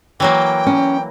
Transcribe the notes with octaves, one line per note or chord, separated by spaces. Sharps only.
E3 F#3 A#3 G5
C#4